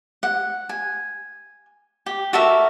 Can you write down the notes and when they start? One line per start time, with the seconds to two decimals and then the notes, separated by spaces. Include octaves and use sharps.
0.23 F#5
0.69 G#5
2.06 G4
2.33 F#4 A4 A#4 E5